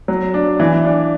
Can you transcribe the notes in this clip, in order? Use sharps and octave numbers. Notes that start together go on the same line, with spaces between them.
F#3
D4
E3
D4